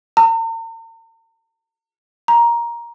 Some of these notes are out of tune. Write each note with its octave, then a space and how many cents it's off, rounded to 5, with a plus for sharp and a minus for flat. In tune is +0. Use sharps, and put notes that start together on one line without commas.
A#5 -45
A#5 +10